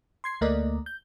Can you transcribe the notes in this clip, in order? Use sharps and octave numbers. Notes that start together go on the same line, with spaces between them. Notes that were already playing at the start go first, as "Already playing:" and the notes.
C6 G#6 C7
D2 A3 A#3 A#4 D5 D#5
G6